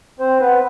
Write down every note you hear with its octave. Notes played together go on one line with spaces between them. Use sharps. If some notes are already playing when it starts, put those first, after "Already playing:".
C4 C5
B3 B4